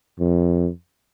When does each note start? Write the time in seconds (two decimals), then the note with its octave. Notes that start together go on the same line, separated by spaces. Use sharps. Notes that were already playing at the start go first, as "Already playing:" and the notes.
0.20 F2